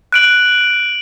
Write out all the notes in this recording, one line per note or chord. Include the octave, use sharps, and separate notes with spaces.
F#6 D7 F#7